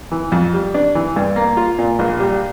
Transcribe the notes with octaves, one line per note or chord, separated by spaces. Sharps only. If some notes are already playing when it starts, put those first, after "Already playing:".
E3
F2
G3
D4
E3
G2
A#3
F4
A#2
A#1
G3